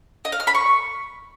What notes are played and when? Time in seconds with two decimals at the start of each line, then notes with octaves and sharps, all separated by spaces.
0.25 D#5
0.32 F5
0.40 F6
0.47 B5
0.55 C#6